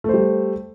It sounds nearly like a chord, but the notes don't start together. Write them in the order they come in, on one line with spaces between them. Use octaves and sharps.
A3 C5 G3